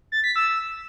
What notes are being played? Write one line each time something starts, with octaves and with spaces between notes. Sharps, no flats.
A6
B6
E6